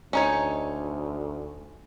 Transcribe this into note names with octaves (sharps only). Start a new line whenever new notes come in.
D2 C#4 D#4 C#5